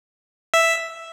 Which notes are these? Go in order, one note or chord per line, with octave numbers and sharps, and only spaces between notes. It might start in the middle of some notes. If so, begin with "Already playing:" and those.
E5